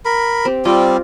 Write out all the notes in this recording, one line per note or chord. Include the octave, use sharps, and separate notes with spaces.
A#4 B5
C4 G4
G3 C4 F4 D5 D#5